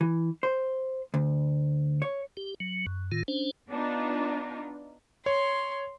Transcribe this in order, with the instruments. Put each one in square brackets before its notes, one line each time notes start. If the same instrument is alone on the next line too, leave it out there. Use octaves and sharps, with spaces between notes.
[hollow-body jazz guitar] E3
C5
D2
C#5
[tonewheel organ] G4
F#3
F#2
A2 D#3 F4
C#4 D4 C5
[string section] B3 D4 D#4 F4
[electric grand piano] C#5 [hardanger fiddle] C6